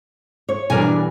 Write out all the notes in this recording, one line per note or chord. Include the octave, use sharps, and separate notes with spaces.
C#5
B2 E3 G3 D4 A#4 G#5